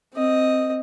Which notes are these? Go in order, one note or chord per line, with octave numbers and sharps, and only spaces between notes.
C4 D#5